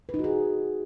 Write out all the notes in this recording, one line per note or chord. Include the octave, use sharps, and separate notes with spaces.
B4
D#4
F#4
G#4